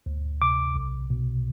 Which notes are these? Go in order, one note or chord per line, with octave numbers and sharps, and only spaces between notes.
D2
C3 D6
B1
B2